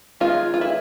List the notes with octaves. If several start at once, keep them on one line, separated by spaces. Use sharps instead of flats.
D#3 G#3 B3 F4
F4
E4